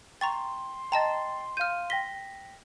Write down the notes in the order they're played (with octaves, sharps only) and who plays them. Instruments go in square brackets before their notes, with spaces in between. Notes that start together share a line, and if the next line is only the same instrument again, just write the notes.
[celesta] G5 [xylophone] A#5 C#6 A6 [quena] C6
[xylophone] D#5 A5 A#5 [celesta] G5 A6
[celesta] F5 D#7 [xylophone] F6 G6
[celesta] G5 A#6 B6 [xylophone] G7